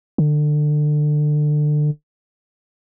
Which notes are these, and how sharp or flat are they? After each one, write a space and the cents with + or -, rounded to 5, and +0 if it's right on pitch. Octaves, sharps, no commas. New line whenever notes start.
D3 +25